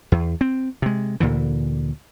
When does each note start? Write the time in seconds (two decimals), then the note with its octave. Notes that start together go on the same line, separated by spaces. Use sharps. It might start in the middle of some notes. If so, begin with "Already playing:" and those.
0.12 E2
0.41 C4
0.82 C3 G#3
1.20 D2 A#2 D3 E3